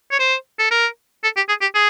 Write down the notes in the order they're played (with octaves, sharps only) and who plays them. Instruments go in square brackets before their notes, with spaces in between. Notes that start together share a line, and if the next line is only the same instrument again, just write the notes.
[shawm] C#5
C5
A4
A#4
A4
G4
G#4
G4
G#4